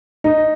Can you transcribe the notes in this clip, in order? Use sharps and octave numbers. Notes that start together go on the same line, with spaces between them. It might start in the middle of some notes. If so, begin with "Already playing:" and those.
D#4